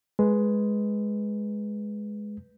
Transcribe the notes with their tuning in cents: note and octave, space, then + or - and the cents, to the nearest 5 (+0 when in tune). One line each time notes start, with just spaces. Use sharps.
G#3 +5 B4 +0